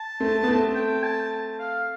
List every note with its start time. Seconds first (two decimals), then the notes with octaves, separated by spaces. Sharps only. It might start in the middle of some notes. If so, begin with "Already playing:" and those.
Already playing: A5
0.20 A3 C4
0.43 B3
0.48 A3 C4
0.75 G5
1.03 A5
1.59 F5